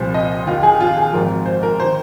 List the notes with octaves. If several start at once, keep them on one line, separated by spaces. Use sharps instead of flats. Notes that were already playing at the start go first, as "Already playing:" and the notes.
Already playing: C2 A#2 F3 C5
D#5
D#2 D#3 F4
G#4
F4
G#4
G#1 G#2 F3 A#4
C5
A#4
D#3 C5